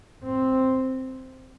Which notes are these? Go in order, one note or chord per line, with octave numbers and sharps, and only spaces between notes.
C4